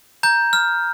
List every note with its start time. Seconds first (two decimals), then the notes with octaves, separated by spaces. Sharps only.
0.23 A#5 G6
0.53 F6